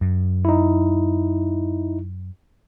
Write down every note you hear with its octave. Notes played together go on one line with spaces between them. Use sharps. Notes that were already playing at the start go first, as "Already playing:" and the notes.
F#2
D#4 E4